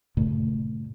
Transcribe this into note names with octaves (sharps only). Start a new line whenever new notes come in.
G2 A#2 C#3 A3